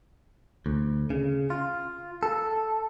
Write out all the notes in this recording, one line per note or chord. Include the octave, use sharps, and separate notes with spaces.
D2
C#3
F4
A4